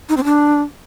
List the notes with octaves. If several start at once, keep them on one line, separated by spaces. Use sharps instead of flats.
D#4
C4
D4